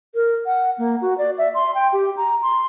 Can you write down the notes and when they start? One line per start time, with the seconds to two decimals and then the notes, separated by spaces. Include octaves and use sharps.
0.15 A#4
0.46 F#5
0.78 A#3
1.02 F#4
1.18 D5
1.38 E5
1.55 C6
1.75 G5
1.93 G4
2.17 A#5
2.42 C6